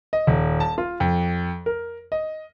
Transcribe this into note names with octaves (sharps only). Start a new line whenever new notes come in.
D#5
D#1
A5
F4
F2
A#4
D#5